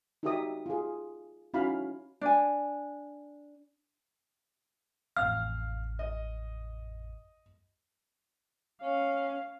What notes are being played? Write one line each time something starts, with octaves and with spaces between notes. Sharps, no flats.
D#4 F#4 G4 A#4 E5 D#6
F4 G#4
C#4 D#4 E4 F#4 F5 B5
D4 G#5
A1 F2 F5 F6
D#5
C#4 F5